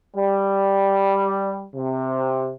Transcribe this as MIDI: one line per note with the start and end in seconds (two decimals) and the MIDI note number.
0.17 1.65 55
1.76 2.53 48